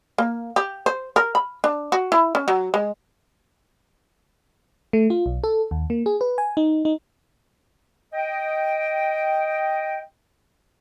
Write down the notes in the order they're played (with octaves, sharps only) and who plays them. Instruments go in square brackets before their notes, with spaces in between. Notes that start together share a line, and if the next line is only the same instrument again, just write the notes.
[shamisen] A#3
G4
C5
A#4
B5
D4
F#4
E4
C#4
F#3
G#3
[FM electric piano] A3
F4
B1
A4
D#2
A#3
G#4
B4
G#5
D#4
D#4
[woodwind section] D#5 G5